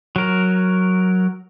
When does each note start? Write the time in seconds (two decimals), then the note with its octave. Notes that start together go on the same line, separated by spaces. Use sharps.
0.16 F#3 A#4